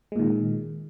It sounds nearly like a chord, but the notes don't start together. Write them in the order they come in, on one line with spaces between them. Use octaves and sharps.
G#3 A#2 D#3